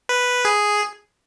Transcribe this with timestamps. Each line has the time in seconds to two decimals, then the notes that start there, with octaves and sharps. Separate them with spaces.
0.09 B4
0.45 G#4